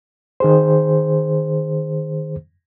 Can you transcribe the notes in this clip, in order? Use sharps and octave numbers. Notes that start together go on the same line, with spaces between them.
D#3 G#4 C5